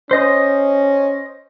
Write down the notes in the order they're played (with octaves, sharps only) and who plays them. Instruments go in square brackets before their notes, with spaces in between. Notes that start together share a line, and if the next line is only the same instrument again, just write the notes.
[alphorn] C#4 [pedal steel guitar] C5 D#5 D#6